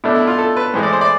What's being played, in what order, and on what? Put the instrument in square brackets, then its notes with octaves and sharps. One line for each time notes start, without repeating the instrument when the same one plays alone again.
[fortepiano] B2 A3 D4 E4
E4
F4
A4
B4
A2 E3 G#3 C5
D5
C5
D5